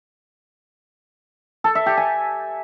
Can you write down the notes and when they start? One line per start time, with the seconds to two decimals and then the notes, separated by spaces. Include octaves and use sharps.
1.64 A4
1.75 E5
1.86 G4
1.97 G#5